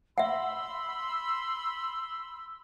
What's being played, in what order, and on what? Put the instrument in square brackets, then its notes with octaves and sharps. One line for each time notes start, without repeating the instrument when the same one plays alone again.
[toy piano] E5 F#5 [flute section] B5 C6 E6